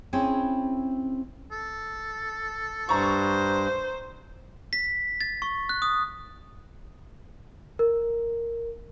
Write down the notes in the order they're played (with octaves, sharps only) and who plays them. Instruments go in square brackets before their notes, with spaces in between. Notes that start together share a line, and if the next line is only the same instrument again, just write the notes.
[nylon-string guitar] C4 C#4 E4 G#4
[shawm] A4
[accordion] G2 [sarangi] C5 [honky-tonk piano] A#5 C#6
[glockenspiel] B6
A6
C#6
F#6
D#6
[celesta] A#4